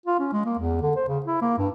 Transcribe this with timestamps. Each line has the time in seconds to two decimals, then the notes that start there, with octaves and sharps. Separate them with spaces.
0.06 F4
0.19 C#4
0.32 G#3
0.46 A#3
0.59 E2
0.82 D3
0.96 C5
1.08 C#3
1.26 E4
1.42 A#3
1.58 G2